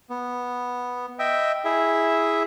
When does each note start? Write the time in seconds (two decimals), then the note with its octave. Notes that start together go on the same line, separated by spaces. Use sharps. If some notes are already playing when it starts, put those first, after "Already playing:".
0.10 B3
1.19 D#5 E5 G5
1.65 E4 G#4 E5